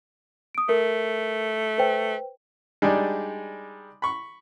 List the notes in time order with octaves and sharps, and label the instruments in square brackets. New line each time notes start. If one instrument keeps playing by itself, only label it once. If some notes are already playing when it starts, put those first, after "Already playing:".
[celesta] D#6 D7
[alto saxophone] A3 [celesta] A#4
[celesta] B4 C5 G5
[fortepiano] G3 G#3 D4 D#4 G#4
B5 C#6